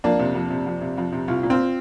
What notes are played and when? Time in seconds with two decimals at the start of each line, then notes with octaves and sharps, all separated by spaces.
0.04 F2 A#3 D4
0.19 C3
0.35 F2
0.50 C3
0.66 F2
0.81 C3
0.98 F2
1.12 C3
1.28 C2 F4
1.43 A#2
1.50 C4 F4